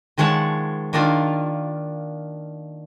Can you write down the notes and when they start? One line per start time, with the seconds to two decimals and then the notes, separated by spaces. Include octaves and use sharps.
0.18 D#3 F3 G#3 C#5 F#5 A5
0.93 D#3 A#3 D4 D#4 F4